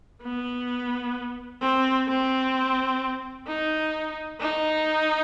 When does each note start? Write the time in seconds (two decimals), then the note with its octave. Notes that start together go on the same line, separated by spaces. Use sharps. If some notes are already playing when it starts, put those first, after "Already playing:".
0.22 B3
1.62 C4
2.08 C4
3.48 D#4
4.40 D#4